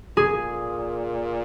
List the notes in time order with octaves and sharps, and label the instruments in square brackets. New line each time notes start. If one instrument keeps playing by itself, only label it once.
[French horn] A#2 [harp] G#4